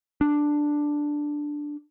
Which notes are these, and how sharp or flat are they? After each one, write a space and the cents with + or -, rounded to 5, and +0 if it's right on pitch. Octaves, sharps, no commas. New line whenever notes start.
D4 +5